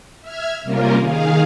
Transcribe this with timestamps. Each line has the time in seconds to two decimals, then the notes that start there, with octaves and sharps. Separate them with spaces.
0.21 E5 F6 G#6
0.63 C3 G3 A#3 C#4 F4 A#4
0.98 D#3 G#4 F5